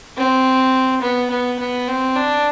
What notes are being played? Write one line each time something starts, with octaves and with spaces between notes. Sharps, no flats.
C4
B3
B3
B3
C4
D4